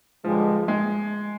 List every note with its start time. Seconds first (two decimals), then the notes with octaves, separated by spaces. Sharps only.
0.24 G2 D3 F3 G#3
0.68 G#3